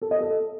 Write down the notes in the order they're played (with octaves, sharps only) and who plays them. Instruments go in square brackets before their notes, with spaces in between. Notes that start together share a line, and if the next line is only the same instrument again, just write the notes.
[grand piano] A4
D#5
A4